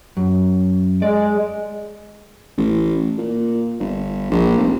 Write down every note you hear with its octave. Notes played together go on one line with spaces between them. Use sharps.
F#2
G#3 D5
A1
A#2
G1
A#1
F1